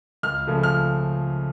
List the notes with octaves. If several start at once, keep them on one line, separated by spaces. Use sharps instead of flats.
C#2 F6
C#3 F3 A3
F6